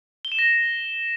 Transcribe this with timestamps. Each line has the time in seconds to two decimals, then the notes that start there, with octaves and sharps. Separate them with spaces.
0.25 G7
0.32 E7
0.39 A#6